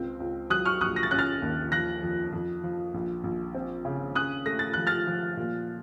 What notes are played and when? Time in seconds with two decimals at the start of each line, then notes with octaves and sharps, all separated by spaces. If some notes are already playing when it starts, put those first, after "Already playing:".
Already playing: C#2 C4
0.20 C#2
0.50 F#3 D#6 F#6
0.65 C#6 F6
0.81 A#1 D#6 F#6
0.96 A#6
1.03 A6
1.11 C#4 F#6
1.19 F6 A6
1.42 D#2
1.72 F3 F#6 A#6
2.02 F2
2.33 F2
2.64 F3
2.94 A#1
3.24 A#1
3.54 C4
3.85 C#3
4.15 C#4 D#6 F#6
4.45 A3 A#6
4.59 A6
4.74 F3 F#6
4.87 F6 A6
5.07 F3
5.37 A#2